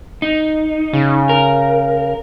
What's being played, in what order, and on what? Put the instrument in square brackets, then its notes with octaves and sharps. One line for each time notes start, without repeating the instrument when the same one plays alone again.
[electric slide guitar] D#4
[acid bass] C#3
[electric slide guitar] A#4